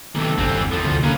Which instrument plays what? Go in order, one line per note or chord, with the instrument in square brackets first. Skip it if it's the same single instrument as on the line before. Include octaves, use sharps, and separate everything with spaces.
[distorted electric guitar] B1 C3 [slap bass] G2 D#3 A#3 [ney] A4
[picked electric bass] G1 [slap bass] E2 D4 [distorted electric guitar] E3 C4
[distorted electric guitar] C2 F3
[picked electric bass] D2 D3 [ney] A4
[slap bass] D3 D4 [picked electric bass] A#3 [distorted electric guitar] C#4 B4 [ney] A#5